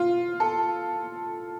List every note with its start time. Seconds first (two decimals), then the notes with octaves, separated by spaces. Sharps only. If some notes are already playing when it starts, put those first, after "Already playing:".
Already playing: F4
0.40 A4